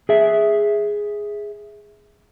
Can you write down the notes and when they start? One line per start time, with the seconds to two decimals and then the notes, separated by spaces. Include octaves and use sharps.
0.09 G#4 E5